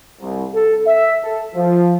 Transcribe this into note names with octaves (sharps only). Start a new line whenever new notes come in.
C2
A4
E5
A4
F3